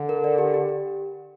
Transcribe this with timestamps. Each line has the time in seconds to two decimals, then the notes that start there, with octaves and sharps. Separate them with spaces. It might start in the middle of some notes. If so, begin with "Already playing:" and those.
Already playing: D3
0.09 A#4
0.24 D5
0.38 G4
0.54 G4
0.69 G4